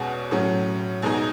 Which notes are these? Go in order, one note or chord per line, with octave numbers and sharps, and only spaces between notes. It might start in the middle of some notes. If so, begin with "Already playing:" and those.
Already playing: E2 B2 G#3 C#4 F#4
A2 F#3 C#4
E2 B2 G#3 D#4 G#4